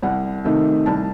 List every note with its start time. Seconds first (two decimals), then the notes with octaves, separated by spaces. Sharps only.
0.02 C2 F#5
0.44 C3 D#3 A3 D#4
0.86 C2 A5